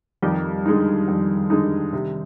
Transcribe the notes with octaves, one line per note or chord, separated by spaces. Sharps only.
F2 D#3 G3
D3 G#3 D#4
F2
D3 G#3 D#4
C3